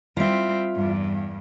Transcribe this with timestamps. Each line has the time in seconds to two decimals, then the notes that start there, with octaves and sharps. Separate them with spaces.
0.17 G3 C4 F4 E5
0.76 E2 G2